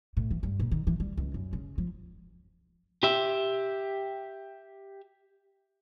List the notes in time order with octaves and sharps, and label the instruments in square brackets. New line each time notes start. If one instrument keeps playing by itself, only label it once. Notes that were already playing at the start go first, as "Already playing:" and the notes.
[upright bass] A2
E3
G2
A#2
D#3
E3
G3
C#2
F#2
C#3
F3
[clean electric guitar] G4 E5